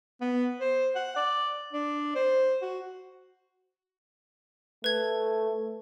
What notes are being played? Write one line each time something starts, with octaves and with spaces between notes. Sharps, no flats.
B3
C5
F#5
D5
D4
C5
F#4
A3 B4 G#6